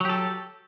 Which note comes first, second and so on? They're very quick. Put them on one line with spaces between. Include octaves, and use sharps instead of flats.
F#3 G4 A4